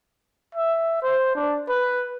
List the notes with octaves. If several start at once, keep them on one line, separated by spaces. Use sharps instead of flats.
E5
C5
D4
B4